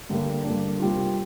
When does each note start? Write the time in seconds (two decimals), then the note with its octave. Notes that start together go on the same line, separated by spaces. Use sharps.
0.09 G2 D3 G3 A#3 D4
0.44 G2 D3 G3 A#3 D4
0.80 C3 G3 A#3 F4